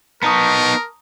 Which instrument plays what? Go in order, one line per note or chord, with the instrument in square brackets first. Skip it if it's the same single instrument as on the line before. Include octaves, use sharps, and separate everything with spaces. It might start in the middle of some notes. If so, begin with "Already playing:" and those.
[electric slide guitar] B3 D#4 [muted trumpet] A#4 [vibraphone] A5 C#6 [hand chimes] A#5 D#6